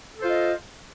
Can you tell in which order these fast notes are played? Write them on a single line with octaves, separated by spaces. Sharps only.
A4 C5 F4 D#5